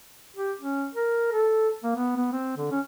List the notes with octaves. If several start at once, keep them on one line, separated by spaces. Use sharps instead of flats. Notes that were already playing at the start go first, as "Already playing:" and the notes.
G4
C#4
A#4
A4
A#3
B3
B3
C4
D3
C#4